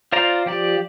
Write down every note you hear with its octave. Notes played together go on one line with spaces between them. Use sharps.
F4 C5 D5 F5 A#5
F3 G4 D5